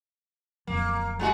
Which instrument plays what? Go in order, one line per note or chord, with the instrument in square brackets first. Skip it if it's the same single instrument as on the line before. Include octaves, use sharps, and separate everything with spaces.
[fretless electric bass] D1 F2 F3 [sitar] A#3
[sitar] G#3 E4 F#4